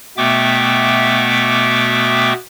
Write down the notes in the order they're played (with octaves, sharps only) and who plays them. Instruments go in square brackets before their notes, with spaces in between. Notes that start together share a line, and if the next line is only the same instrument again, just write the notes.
[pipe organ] B2 A3 B3 E5 G5 D6